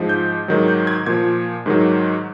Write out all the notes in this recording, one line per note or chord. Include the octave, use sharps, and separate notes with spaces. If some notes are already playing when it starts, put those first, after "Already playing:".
Already playing: G#2 F3
G6
G#2 D#3 F#3
G6
G#6
A#2 F3 G#6
G#2 D#3 F#3